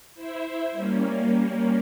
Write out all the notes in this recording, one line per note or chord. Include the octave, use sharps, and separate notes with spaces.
E4 C5 E5
G3 A#3 C#4